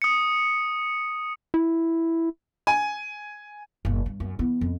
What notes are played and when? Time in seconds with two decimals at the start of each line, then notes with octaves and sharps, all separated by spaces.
0.02 D#6 C#7
1.54 E4
2.67 G#5
3.85 F#1 A#2
4.06 G2
4.20 F#2
4.39 E3 B3
4.61 F2